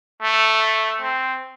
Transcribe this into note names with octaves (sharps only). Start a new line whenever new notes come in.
A3
C4